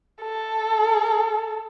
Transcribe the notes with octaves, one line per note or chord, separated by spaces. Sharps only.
A4